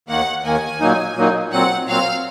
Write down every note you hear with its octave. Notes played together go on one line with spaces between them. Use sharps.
D#2 D#3 A#3 F#5
D#2 D#3 A#3 G#5
A#2 F#3 A#3 D#4
A#2 F#3 A#3 D#4
A#2 F#3 C4 F#5
A#2 F#3 C4 F5